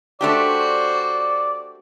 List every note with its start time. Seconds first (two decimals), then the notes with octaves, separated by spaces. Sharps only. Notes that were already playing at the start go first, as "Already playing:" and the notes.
0.21 A3 D4 F#4 G4 C5 D5